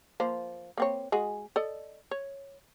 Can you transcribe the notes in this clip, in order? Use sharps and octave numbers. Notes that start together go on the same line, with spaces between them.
F3 A#3 C5
A#3 C4 C#5
G#3 F#4 G#4
A4 D5 D#5
C#5